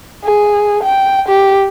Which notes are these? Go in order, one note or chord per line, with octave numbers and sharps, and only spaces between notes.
G#4
G5
G4